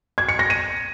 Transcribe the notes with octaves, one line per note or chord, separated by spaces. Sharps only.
G#6
C#7
A#6
D#7